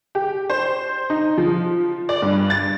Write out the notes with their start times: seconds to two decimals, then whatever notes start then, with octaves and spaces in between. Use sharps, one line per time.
0.15 G4
0.50 C5
1.10 D#4
1.38 F3
2.09 D5
2.22 G2
2.50 A6